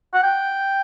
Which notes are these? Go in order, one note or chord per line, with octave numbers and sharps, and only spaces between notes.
F#5
G5